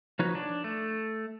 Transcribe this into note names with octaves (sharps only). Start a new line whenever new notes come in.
F3 D#4 F#4 B4 C#5
D4
A3